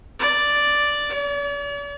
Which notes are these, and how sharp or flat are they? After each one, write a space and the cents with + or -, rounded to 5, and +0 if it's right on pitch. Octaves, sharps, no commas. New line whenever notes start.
D5 +0
D5 -45